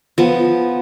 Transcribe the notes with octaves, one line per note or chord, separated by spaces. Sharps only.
F3 B3